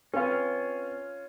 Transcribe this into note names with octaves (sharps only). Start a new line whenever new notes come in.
C4 C#4 F4 B4 F5